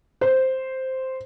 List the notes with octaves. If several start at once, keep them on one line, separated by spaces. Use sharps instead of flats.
C5